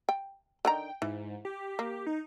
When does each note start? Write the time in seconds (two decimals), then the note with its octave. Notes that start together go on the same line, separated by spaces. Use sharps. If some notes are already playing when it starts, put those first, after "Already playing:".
0.09 G5
0.65 D3 D#3 G5 A#5
1.02 G#2 E3
1.45 G4
1.79 A#3
2.07 D#4